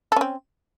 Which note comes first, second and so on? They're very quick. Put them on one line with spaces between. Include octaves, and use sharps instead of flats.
A4 C#4 C4